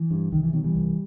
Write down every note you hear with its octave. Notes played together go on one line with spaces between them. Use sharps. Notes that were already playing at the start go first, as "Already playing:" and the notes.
Already playing: E3
G2
C2 D#3
E3
B2 D#3 F#3
E3 G3
C2